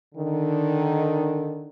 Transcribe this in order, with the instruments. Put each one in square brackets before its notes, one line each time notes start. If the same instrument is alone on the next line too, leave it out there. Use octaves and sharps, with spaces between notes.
[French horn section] D3 D#3